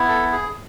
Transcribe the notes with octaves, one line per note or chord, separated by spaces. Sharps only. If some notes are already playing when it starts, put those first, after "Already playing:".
Already playing: B3 E4
A4
G#4